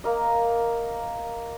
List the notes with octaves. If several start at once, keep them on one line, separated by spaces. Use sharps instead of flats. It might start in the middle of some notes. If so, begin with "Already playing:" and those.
A#3 A#4 D#5